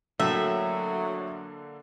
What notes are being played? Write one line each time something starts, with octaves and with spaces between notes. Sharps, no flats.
A2 D3 F#3 A#3 A4 E5